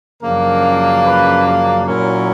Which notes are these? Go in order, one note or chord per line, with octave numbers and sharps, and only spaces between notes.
F#2 C#3 F3 A#3 D4 A#4
B4
A#4
A#2 F#3 A#3 C#4 E4 A#4